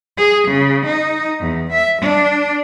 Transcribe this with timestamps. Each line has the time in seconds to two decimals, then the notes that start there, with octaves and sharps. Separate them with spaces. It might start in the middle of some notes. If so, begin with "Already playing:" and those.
0.17 G#4
0.48 C#3
0.86 D#4
1.40 E2
1.72 E5
2.02 D4